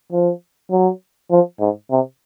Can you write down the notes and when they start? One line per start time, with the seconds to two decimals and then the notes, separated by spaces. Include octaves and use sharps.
0.12 F3
0.71 F#3
1.31 F3
1.60 G#2
1.91 C3